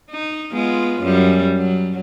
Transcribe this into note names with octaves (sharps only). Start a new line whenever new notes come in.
D#4
G#3 B3 F4
F#2 G3
F#3